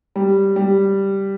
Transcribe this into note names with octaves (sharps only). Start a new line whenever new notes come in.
G3
G3